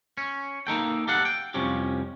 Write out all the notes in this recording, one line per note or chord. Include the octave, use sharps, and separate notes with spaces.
C#4
A#3 D#4 A4 G5
G4 A4 F5 F#5
G5
C2 F2 F3 C#4 G4